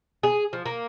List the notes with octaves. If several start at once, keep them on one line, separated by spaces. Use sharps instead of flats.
G#4
F3
A#3